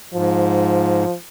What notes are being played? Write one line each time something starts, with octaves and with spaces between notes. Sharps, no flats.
G#2 F3